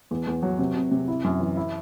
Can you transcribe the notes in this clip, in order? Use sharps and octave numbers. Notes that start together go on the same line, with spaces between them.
E2
E2
F#3
C3
C3
C3
E4
F#2
E3
E4